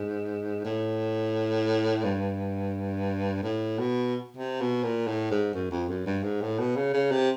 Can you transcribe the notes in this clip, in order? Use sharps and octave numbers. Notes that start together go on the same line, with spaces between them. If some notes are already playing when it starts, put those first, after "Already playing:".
Already playing: G#2
A2
G2
A2
B2
C3
B2
A#2
A2
G#2
F#2
F2
F#2
G2
G#2
A2
B2
C#3
C#3
C3